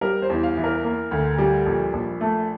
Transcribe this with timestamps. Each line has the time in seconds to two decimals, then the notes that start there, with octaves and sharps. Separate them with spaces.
0.01 G3 A#4
0.22 C5
0.30 E2
0.43 F5
0.57 E3
0.64 A#4
0.84 A#3
1.11 D2
1.38 G3
1.66 A#1
1.93 A#1
2.21 A3